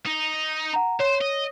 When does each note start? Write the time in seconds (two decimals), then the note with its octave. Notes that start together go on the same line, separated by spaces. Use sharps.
0.06 D#4
0.74 F#5 A#5
1.00 C5 C#5
1.21 D#5